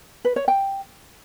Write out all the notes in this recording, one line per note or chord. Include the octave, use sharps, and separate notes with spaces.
B4
C#5
G5